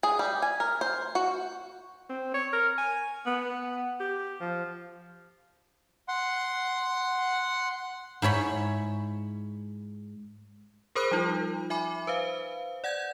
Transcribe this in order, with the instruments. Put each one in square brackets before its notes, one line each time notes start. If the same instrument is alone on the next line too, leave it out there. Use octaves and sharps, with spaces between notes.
[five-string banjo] G#4
G3
G#5
A#4
C5
F#4
[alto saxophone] C4
C#5
A#4
G#5
B3
G4
F3
[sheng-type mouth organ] F#5 C6
[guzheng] G#2 E4 C#5 B5
[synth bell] G#4 A#4 C5 B5 D#6 F#6
F3 G3 D#4 F4
E5 G#5 B5 D6
B4 C5 F5
D5 F#5 G6 G#6